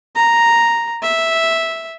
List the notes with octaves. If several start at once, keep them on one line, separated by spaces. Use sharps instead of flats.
A#5
E5